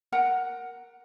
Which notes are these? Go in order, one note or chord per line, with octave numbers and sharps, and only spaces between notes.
A#4 F#5 A#5